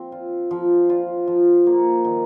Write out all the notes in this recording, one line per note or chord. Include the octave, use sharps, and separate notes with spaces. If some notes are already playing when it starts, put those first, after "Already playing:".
Already playing: F3 C4
F4
F3
F4
F3
A#3
D#3